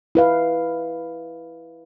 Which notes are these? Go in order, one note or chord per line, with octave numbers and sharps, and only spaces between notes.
E4 B4 F5